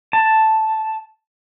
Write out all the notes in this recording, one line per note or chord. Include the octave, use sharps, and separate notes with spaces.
A5